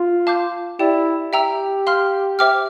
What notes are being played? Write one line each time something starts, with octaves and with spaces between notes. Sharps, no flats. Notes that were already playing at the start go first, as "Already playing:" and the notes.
Already playing: F4
F5 A5 D6 G6
E4 G4 D5 G5
G4 E5 G5 A#5 E6
F5 C6 F6
C5 E5 G5 D6 F6